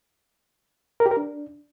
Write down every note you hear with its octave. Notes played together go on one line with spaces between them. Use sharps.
A#4
G4
A#4
D4